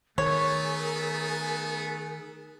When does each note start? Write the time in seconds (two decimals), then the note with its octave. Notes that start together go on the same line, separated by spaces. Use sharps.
0.18 D#3 A3 B3 G#4 A#4 C#5 G#5